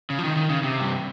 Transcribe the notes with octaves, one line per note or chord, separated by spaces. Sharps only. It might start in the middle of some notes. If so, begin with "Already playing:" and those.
C#3
F3
D#3
D#3
C#3
C3
G2